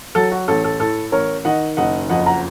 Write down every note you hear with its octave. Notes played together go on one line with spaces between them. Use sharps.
F#3 A4
F#4
A1 A4
A4
A2 A4
A1 A#4 C#5
D#3 D#5 F#5
F#1 D#5 F#5
F2 D#5 F#5
F#5 A#5